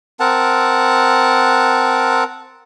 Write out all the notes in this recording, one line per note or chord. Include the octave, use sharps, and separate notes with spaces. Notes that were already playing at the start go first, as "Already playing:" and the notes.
C4 A#4 F#5 A5